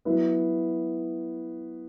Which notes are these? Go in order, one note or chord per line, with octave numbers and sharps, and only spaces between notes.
F#3 B3 E4